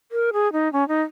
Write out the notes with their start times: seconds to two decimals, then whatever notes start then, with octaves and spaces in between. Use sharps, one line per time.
0.12 A#4
0.33 G#4
0.53 D#4
0.73 C#4
0.88 D#4